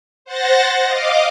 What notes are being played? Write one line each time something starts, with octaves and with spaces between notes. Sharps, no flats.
C5 F#5 A6 A#6
D#5 F5 D6